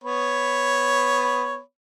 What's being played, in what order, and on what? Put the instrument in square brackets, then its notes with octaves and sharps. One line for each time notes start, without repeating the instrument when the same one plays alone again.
[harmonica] B3 C#5 B5